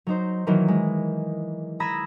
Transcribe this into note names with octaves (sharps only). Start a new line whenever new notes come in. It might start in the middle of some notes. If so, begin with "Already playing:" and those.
F#3 D#4 C5
D#3 E3 F#3 A#3
G#3
A#5 B5 D#6 E6 G#6 A#6